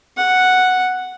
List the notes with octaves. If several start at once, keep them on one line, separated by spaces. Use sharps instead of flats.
F#5